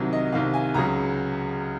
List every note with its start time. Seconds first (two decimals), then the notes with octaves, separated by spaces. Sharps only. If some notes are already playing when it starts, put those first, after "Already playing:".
Already playing: C2 C3 D#3 F#3
0.13 D#5
0.32 C2 C3 D#3 F5
0.54 G#5
0.74 C#2 C#3 F#3 A#5